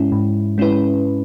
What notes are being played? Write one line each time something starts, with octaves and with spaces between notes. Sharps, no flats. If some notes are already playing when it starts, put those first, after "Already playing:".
Already playing: G#2 G#3 C#4 E4
G#2
G#3 C#4 E4 B4